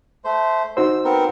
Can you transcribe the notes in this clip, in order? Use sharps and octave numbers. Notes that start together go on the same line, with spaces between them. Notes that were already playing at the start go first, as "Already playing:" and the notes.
A3 C5
D#4 F#4 C5 E6
B3 C4 A#4